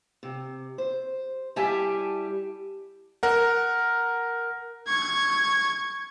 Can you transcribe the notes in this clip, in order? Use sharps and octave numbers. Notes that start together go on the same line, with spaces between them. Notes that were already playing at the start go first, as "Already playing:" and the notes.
C3
C5
G3 E4 G4 E5 G#5 A5
A#4 F#5
C#6 G#6